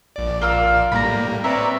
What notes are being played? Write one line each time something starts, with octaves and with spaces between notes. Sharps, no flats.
A#1 D5
A#3 F4 E6
A2 G3 A#3 A#5 B5
C4 A#4 B4 C#5 D5 E5